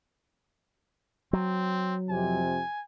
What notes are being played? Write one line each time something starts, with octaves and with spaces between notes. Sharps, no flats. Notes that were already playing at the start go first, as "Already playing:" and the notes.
F#3 C4
F2 C3 G#5